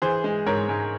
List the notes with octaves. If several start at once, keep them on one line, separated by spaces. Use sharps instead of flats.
E3 G#4 C5
G#3
G#2 A#4 C#5
G#2